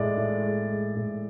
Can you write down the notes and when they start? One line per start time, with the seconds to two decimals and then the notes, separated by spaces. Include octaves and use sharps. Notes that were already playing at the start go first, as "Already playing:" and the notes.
Already playing: A2 G#3 D5
0.17 A2
0.43 G#3
0.69 G#3
0.95 A2